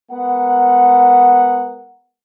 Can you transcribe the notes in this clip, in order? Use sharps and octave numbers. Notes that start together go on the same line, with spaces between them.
G#3 B3 A#4 F#5